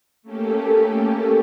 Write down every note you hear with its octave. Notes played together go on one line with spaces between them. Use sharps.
A3 A#3 C#4 G4 A4